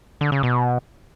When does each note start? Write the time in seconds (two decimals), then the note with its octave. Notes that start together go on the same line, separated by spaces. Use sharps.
0.21 D3
0.32 C#3
0.43 B2